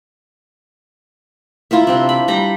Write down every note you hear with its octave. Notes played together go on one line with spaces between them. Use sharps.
E4 F4 A#4 E5
C3 C4 D4
B5
G3 A#5 B5